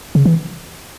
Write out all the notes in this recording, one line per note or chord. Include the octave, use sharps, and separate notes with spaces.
C#3
E3